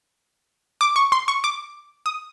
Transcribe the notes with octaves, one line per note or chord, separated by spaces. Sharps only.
D6
C#6
C6
C#6
D6
D#6